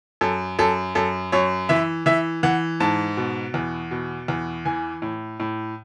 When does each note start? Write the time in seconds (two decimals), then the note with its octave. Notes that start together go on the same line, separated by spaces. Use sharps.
0.21 F#2 A4
0.59 F#2 A4
0.95 F#2 A4
1.32 F#2 C#5
1.69 E3 E5
2.06 E3 E5
2.43 E3 F#5
2.80 G#2 A5
3.17 B2
3.54 E2
3.91 B2
4.28 E2
4.65 E3 G#5
5.02 A2
5.40 A2